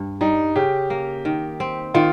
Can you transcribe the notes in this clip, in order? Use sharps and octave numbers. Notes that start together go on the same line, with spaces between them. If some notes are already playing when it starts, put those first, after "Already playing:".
Already playing: G2
G3 D#4
C#3 G4
A#3
D#3
C4
D#3 F4